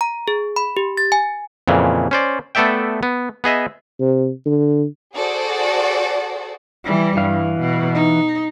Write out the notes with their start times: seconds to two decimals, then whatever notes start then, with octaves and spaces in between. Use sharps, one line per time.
0.01 A#5
0.28 G#4
0.56 B5
0.77 G4
0.97 A6
1.12 G#5
1.68 F2 A#2 C#3 E3
2.11 C#4 C5 D5
2.55 A3 B3 A4 D5 E5 G5
3.03 B3
3.44 B3 G#4 D#5 E5
4.00 C3
4.46 D3
5.14 F#4 G#4 A4 C5 D5
6.84 E3 G3
7.17 G2 E3 F5
7.60 B2
7.95 D#4